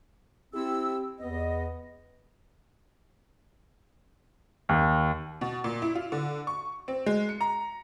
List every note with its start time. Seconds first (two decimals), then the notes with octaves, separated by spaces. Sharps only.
0.54 C4 E4 G4 E6
1.21 E2 B3 D#5
4.69 D#2
5.41 B2
5.64 A#2
5.82 E4
5.95 F4
6.12 D3
6.47 C#6
6.88 C4
7.06 G#3
7.29 C#7
7.41 A#5